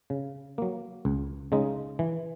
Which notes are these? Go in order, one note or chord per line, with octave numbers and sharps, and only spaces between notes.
C#3
F#3 A#3
C#2
C#3 G#3 D#4
E3